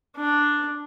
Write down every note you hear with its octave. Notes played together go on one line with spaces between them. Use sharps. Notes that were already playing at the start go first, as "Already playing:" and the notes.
D4